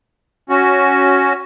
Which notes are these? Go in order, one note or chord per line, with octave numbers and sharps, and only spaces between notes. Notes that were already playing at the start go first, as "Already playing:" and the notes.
C#4 F#4